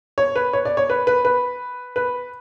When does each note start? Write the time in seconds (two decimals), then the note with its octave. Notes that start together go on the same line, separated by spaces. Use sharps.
0.18 C#5
0.36 B4
0.53 C#5
0.65 D5
0.77 C#5
0.90 B4
1.07 B4
1.25 B4
1.96 B4